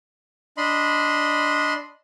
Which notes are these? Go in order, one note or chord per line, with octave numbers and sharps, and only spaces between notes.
D4 D#5 B5 C6